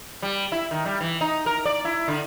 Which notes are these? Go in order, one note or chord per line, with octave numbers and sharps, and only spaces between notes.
G3
E4
D#3
G3
E3
D#4
A#4
D5
E4
D3